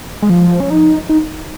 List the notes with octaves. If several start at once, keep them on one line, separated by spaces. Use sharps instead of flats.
G#3
F3
C#4
D#4
D#4